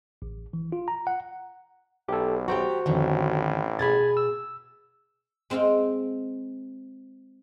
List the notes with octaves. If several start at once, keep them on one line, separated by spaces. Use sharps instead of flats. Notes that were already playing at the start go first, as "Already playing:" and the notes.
A1
E3
F4
A#5
F#5
B1 G4 A4
F#4 G4 C5 G5 A#5
A1 F2 D3 D#3
B2 G#4 G#5 B5 G#6 A6
E6
G#3 C4 D#5 F5 G5